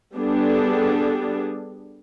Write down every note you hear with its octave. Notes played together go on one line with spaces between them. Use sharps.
G3 B3 D4 G#4 A4